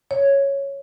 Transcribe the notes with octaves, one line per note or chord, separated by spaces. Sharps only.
C#5